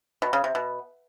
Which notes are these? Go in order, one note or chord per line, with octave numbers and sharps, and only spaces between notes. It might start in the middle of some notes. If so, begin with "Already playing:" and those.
B2
C#3
C3
B2